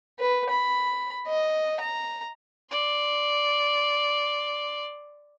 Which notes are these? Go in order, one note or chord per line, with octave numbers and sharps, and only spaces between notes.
B4
B5
D#5
A#5
D5 C6